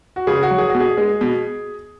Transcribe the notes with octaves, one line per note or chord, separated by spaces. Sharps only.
F#4
C#3 G#4
F#4
F#3
G#4
F#4
B2
G#4
G#3
B2